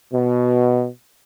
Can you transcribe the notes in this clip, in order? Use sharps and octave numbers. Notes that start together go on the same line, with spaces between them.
B2